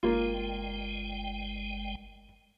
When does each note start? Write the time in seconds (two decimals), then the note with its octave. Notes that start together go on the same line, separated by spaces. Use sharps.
0.03 G1 G#3 A#3 F4 G5